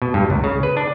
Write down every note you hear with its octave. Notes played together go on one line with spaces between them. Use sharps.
B2
G2
C#2
C#3
B4
D4